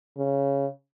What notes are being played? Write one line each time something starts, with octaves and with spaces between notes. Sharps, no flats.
C#3